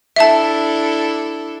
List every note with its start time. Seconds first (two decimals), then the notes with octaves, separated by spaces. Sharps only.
0.16 D4 E4 A4 E5 A5